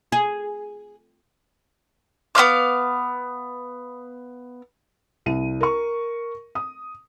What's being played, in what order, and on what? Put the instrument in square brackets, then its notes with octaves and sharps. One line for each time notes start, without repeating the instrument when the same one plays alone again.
[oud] G#4
[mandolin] B3 C#4 F5 D6
[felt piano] C2 D#7
A#4 C#6
D#6